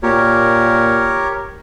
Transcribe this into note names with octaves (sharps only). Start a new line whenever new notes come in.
A#2 G4 A#4 C#5